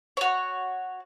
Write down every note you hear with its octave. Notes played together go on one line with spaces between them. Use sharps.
F#4 C#5